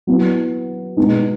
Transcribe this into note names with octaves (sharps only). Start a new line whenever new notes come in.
F#3 B3 E4
B2 G#3 B3 D#4